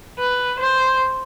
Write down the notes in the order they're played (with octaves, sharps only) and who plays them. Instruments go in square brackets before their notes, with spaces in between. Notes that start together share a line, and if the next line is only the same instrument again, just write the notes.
[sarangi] B4
C5